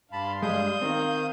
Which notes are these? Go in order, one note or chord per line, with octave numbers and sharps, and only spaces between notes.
G2 D4 F5 A5 B5 C6
G3 G#3 D#6 G6
D#3 C4 F5